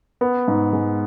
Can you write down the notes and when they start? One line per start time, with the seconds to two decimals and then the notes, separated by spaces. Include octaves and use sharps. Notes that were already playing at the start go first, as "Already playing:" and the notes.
0.21 B3
0.48 G#2
0.73 G#3